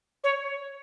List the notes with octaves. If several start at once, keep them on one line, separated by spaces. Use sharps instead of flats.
C#5